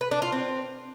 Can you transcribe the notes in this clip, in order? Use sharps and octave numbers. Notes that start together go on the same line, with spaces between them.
B4
D4
F4
C4